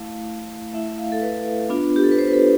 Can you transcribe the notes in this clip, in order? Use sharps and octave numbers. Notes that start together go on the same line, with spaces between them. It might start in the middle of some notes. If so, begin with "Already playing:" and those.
Already playing: A3 E4 F5
A3 E4 E5
F5
A4
B4
B3 D4 F4
G4
A4
B4
C5
B4
A4